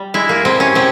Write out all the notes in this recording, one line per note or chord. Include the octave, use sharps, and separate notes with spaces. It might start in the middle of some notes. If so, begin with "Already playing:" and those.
Already playing: G3
G#3 E4
A#3
C3 C4
C#4
C3 C4